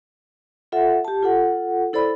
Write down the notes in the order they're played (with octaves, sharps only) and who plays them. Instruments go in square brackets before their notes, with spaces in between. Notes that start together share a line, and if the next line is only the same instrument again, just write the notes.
[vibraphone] F4 A4 E5 F#5
G4 A5
F4 A4 F#5
E4 A4 C5 D5 B5